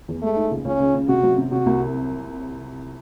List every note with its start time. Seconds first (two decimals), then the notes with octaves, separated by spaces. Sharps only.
0.08 E2
0.22 G#3 A3
0.36 D#4
0.51 C#2
0.65 C#2 C#4
0.80 C#3
0.95 C#3
1.08 C3 F#4
1.23 F#3
1.38 C3
1.52 C3 F#4
1.66 C2